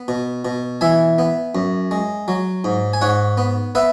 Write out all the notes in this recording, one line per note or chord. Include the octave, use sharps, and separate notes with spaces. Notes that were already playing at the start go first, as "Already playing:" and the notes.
Already playing: B3
B2
B2
E3 E5 G#5
B3
F#2
G#3
F#3
G#2
G#5
G#2 C#5 F#5
B3
B3 B4 E5